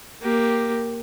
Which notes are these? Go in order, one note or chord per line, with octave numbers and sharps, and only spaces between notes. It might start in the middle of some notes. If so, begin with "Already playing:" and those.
A#3 G4